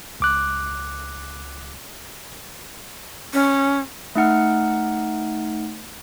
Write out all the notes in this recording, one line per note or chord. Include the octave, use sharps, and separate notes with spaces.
C#2 D6 F#6
C#4
A3 D#4 F#5 F6